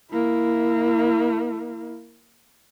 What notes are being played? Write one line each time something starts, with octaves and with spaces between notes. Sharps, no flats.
A#3 E4